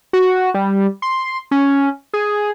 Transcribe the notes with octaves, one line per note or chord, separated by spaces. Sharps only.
F#4
G3
C6
C#4
G#4